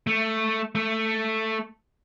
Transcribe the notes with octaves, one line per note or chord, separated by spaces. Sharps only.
A3
A3